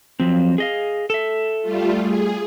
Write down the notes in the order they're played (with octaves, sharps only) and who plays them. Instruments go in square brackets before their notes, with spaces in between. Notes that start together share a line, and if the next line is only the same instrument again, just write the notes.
[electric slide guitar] F3 F#3 C4
G#4 D#5 F5
A4 E5
[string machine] G3 A3 F4
G#4